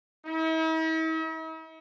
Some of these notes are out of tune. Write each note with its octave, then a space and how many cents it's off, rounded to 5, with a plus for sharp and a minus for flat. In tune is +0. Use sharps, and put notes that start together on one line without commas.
E4 -45